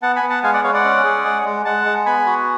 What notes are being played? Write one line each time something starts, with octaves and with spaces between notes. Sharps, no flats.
B3 F#5 A5
G#5 B5
B3
F#5 A5
G#3 F5 G#5
D5 F#5
G#3 C#5 F5
D5 F#5
C#4
G#4
G#3
G#3
G#3 F#5 A5
G#3
B3 G#5 B5
F#4